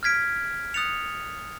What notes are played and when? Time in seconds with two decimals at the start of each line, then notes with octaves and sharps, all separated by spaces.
0.03 F6 G#6 B6 D7
0.74 D#6 F#6 A6 C#7 F7